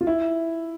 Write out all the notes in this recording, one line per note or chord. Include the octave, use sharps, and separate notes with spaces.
F4
E4